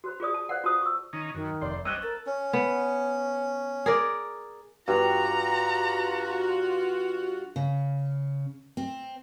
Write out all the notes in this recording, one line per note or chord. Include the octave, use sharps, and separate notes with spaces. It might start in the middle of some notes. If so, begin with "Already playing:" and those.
F#4 C5 B5
F4 G#4 D5 D#6
A5
C5 D5 F5 F#5
F4 F#4 C5 A5 D#6
C#6 E6
D#3 C#4 D#4
F#2 D#3
F1 C5 D5 C6
G3 C#4 C5 D#5 E6 F#6 G7
A4 A#4
C#4
B3
G#4 A#4 D5
G2 F4 F#4 A#5
C#3
C4